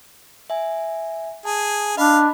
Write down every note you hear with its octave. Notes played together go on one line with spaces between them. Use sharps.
E5 G#5
G#4 A5
D4 D#5 F5 B5